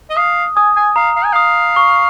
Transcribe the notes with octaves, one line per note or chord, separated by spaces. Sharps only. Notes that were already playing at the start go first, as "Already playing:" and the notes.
D#5
F5 D#6
G#5 D#6
G#5
F5 A#5
F5
G#5
F5 D#6
C#6